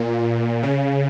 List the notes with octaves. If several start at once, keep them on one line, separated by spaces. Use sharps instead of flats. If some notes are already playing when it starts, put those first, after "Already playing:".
Already playing: A#2
C#3